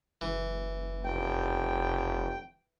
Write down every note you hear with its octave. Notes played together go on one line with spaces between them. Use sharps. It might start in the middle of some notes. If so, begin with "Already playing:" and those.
F#1 E3
F1 G5